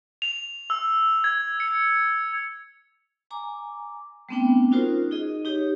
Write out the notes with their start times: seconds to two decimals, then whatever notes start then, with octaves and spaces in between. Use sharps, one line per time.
0.22 F7
0.70 E6
1.24 G#6
1.60 C#7
3.31 G#5 A#5 D6
4.29 G3 A3 B3 C4 D4 G5
4.71 C#4 D#4 F4 F#4 A#4 C5
5.11 D#4 G#4 D#5
5.45 D#4 G4 C#5